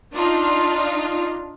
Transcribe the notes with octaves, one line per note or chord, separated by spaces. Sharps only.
D4 D#4 F4